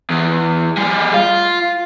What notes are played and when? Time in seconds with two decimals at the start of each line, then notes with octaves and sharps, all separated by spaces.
0.10 E2
0.77 G3 G#4
1.14 F4